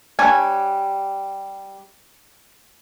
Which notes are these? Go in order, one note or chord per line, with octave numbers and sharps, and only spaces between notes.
G3 D4 C#5 G#5